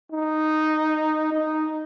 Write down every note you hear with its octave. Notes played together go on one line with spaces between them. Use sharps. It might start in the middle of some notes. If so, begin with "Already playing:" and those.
D#4
D#4